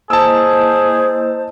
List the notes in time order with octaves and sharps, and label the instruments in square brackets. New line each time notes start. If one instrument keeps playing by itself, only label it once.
[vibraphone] A#3 E4 D#5 [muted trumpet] G#4 [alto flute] C5 [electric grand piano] A5 E6